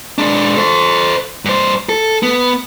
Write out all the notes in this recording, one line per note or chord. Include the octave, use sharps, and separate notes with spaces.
G#3 D4
A4 C5
G2 C5
A4
B3